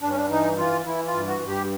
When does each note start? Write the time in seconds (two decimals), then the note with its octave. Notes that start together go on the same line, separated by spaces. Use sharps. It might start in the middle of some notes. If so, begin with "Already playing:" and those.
0.02 G2 D4
0.10 C#4
0.17 D4
0.30 E3 D#4
0.58 E3 F4
0.86 E3 E4
1.07 F4
1.13 G2
1.27 F#4
1.41 G2
1.48 G4